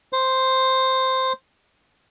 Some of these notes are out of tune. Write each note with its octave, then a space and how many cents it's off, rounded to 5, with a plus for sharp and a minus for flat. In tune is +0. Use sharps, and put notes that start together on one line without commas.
C5 +0